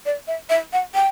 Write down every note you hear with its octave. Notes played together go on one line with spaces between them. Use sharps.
D5
E5
E5
F#5
G5